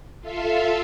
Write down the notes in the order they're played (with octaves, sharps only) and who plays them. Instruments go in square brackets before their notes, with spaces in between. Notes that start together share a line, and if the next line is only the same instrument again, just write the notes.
[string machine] F4 A4 E5 F5